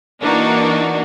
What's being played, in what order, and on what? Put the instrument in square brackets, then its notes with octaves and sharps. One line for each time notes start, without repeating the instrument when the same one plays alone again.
[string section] E3 A#3 D4 D#4 F#4